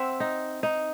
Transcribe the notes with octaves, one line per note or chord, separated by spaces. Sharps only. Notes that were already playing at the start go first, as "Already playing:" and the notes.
Already playing: C4 E5 F#5
D#4
D#4